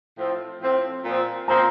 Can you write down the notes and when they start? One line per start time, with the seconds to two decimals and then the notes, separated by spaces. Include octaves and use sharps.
0.17 A2 F3 C4
0.61 A2 F3 C4
1.04 A#2 F3 C4
1.48 A#2 F3 C4 A#5